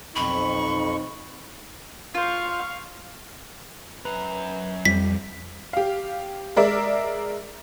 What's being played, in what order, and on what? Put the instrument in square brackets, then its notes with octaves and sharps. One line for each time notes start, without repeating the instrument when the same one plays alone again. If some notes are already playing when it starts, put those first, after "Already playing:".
[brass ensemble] B1 C4 D#4 [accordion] F2 C#6 [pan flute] B5
[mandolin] F4 C5 [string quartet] F5 C#6 F6
[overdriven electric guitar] F#2 A#5 [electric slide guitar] B4
[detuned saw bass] F2 [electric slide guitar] G3 [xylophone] B6
[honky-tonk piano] G4 F5
G#3 A#4 D5 E5